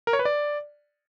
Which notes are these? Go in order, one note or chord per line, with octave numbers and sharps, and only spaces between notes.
A#4
C#5
B4
D5